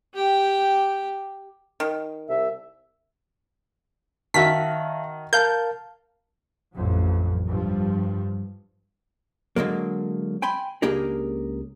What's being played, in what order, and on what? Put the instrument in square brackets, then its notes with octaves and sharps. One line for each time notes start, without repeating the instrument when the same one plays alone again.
[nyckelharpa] G4 G5
[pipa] D#3
[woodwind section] C2 E5
[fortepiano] D#3 F#4 [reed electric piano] E5 F5 A5 [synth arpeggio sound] B6
[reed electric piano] A#4 F5 A5 [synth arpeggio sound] G6
[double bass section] A1 F2 F#3
G2 F3
[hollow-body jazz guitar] D3 F#3 G#3 A#3
G5 G#5 B5 C6
C#2 A#3 D4 G4 G#4 A#4